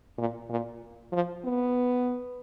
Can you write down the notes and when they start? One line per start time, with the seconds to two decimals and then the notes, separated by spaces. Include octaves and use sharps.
0.18 A#2
0.50 A#2
1.12 F3
1.45 B3